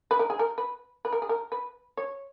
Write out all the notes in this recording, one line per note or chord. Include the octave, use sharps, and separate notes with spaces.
B4
A#4
G#4
A#4
B4
B4
A#4
G#4
A#4
B4
C#5